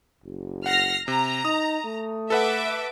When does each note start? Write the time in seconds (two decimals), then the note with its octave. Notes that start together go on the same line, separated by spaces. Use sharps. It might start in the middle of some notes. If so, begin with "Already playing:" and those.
0.24 F#1
0.66 F#5 F6 A#6 C7
1.08 C3 A#5
1.45 D#4 D#6
1.86 A3
2.30 A4 B4 E5 F#5 D6